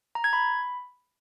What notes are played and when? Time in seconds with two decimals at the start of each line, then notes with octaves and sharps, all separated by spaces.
0.15 A#5
0.24 G#6
0.33 B5